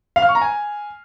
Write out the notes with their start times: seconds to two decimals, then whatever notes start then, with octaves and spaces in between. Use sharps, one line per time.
0.16 F5
0.22 F6
0.29 C#6
0.35 A#5
0.41 G#5